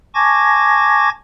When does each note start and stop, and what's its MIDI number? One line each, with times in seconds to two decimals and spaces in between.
0.15 1.09 80
0.15 1.09 81
0.15 1.09 85
0.15 1.09 86
0.15 1.09 92
0.15 1.09 94